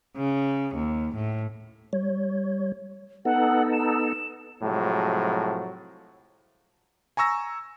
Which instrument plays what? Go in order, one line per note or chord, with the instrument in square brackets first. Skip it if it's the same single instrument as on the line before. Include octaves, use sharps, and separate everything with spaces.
[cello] C#3
D#2
A2
[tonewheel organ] G3 C#5
[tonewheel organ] B3 D#4 A4 [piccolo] F#5
[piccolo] E7
[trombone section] A2 C3 F3 F#3 G#3
[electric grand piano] G#5 A#5 C#6 E6 A#6